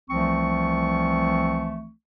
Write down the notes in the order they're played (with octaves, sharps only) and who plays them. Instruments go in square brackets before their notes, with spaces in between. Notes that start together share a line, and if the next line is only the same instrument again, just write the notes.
[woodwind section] C2 E3 F3 A3 C4 C#6